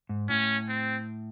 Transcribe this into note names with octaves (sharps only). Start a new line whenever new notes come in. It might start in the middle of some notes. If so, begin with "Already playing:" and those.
G#2
A2 C#4
C4